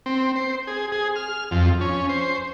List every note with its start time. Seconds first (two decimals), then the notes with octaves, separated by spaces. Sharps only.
0.06 C4
0.36 C5
0.67 G#4
0.92 G#4
1.16 F6
1.51 F2
1.81 C#4
2.09 C5